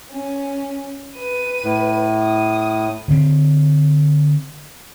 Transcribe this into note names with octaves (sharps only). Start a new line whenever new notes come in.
C#4
B4 D#7
A2
D#6
D3 C4